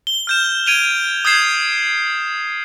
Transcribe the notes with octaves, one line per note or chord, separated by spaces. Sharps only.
G7
F6 G6 E7
G#6 D7 D#7 F7 G7
D#6 G6 G#6 C7 E7